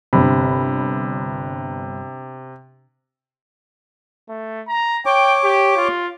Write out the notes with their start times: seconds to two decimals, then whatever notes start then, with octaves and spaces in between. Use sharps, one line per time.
0.13 G1 C3 B5
4.29 A3
4.68 A#5
5.06 C#5 G5 D6
5.44 G4
5.77 F4